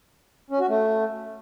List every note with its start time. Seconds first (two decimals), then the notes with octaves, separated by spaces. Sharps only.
0.50 C#4
0.60 F#4
0.69 A3